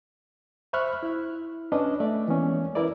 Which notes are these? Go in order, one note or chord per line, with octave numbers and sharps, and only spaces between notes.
C5 E5 B5 C#6 F6 F#6
E4
C#4 D4 B4 D#5
A3 D5 E5
E3 G#3 A#3 B3 C#4
E4 A#4 B4 D5